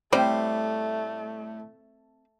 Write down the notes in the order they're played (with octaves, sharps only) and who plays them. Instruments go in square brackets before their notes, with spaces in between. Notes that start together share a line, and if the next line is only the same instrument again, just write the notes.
[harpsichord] A2 [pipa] G3 [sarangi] A3 [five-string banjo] C4 C5